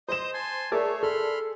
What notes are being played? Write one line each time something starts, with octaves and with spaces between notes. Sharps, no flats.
C5 D#5 D#6 G6 E7
G#5 A5 C6
A3 G#4 A#4 C#5 D5 E5 A5
A4 B5 C6 F6